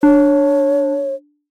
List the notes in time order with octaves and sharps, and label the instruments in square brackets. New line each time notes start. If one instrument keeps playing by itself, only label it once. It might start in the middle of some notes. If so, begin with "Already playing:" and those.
[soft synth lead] D4 [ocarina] C#5